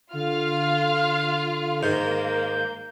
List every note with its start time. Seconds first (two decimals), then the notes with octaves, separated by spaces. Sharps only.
0.13 D3 F4 F5 F6
1.83 G#2 D#3 A#3 G6